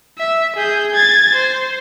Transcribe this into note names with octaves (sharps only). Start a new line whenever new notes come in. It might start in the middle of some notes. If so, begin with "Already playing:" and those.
E5
G#4 G6
G#6 A6
C5